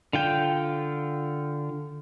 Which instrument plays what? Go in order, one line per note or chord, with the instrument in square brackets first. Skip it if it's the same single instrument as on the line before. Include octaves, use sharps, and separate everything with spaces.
[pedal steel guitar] D3 F4 G5